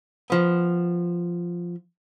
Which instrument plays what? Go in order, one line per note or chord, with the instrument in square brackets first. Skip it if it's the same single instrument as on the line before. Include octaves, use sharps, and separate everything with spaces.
[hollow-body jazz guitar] F3 B3